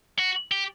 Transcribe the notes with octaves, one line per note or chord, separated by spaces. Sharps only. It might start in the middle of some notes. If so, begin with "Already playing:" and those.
F#4
G4